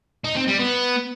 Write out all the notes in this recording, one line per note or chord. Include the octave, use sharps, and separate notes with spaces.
D#4
C4
G3
B3